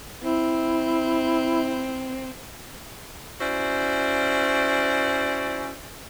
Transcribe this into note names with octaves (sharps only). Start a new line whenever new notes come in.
C4 E4
C#4 E4 F#4 C5 D5